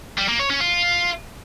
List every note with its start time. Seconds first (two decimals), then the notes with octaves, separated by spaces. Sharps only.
0.18 G3
0.29 A#3
0.39 C#5
0.50 C#4
0.60 F4